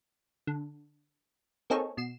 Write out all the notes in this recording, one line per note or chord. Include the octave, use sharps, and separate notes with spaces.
D3
A#3 C4 D#4 G#4 A4 C#5
B2 C7 E7